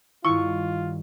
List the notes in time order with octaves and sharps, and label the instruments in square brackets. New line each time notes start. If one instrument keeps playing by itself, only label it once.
[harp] G2 D#3 [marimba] E4 [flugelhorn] F4 [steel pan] C#6